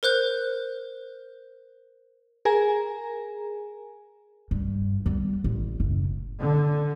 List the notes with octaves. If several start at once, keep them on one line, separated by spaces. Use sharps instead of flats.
A#4 C5 F#6 G6
G#4 A#4 G#5 A#5
G2
G3 B3
A1
F#1
D3